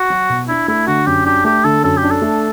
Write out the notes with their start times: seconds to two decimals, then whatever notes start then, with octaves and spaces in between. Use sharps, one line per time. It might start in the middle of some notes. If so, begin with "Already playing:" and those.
Already playing: F#4
0.10 F#3
0.30 B2
0.48 D4 E4
0.68 A3 E4
0.87 D3 F#4
1.06 F#2 G4
1.26 D4 G4
1.45 A3 G4
1.64 D3 A4
1.84 F#2 A4
1.97 G4
2.03 D4
2.11 A4
2.22 A3